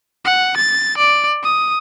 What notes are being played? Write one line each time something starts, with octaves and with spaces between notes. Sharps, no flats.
F#5
A6
D5
D#6